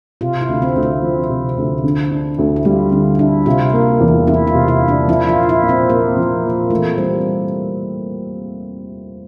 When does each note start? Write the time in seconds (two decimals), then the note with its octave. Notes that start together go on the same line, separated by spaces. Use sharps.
0.21 C3 F4
0.41 E4
0.49 D2
0.62 C4
0.76 D2
0.83 E4
1.02 F3
1.29 C3
1.57 D2
1.84 D3
2.11 D4
2.38 D2
2.56 E4
2.65 G3 F4
2.92 D3 E4
3.19 D4 E4
3.46 C3 F4
3.73 A#3
4.00 E2
4.27 E3 E4
4.47 F4
4.54 C3
4.68 E4
4.81 A#3
4.88 D4
5.08 F3 E4
5.29 F4
5.35 A#2
5.49 E4
5.63 A#2
5.69 C4
5.89 A#3 C4
6.17 F3
6.44 A#2
6.70 E3 A3
6.98 G3 C4